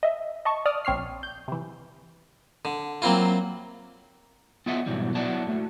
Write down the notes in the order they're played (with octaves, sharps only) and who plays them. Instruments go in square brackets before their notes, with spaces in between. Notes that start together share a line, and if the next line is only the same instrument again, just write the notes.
[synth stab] D#5 E5
D#5 A5 C#6
D5 D#6 F6
A#1 C4 C#5 F6 C7
G6
C3 E3
[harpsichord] D3
F#3 A#3 C4 E4 F4
[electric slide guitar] B3 F4 G#4 D#5 E5 F#5
G#2 B2 E3 F#3 G3
F#3 B3 E4 F#4 D5 A5
A2 A3 F#4